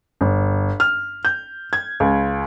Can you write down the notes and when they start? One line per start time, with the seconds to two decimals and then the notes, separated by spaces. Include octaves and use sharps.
0.21 G1
0.80 F6
1.25 G6
1.73 G#6
2.00 C#2